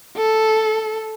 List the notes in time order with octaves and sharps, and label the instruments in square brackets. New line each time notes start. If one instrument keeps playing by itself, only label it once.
[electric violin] A4